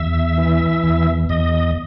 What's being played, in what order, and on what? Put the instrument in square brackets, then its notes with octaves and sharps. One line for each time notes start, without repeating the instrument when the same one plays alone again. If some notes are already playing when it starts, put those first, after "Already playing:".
Already playing: [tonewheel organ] E2 E5
E3
E2
E2 D#5